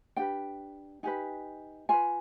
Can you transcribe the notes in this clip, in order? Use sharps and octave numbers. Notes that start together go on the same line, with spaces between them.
D4 G4 B4 G5
D#4 G4 B4 G#5
F4 B4 G#5